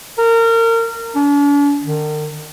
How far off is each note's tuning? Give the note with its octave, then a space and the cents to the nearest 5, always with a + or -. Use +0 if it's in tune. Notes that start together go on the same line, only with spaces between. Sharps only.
A#4 -30
D4 -45
D#3 -40